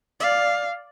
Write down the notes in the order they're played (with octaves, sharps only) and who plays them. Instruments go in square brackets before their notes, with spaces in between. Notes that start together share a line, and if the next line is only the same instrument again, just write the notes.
[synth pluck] D5 [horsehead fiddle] F5